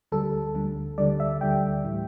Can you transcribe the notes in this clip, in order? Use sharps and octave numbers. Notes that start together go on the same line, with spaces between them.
D2 D3 G3 A4
D2 D3 G3
D2 D3 G3 D5
E5
D2 D3 G3 G5
A2 E3 G3